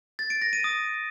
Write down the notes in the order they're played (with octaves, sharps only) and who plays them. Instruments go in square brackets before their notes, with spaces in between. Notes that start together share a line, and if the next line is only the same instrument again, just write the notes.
[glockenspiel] A6
D7
A#6
D#7
D#6